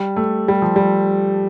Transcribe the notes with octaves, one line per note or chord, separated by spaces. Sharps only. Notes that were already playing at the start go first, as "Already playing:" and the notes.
Already playing: G3
A3
G3
F3
G3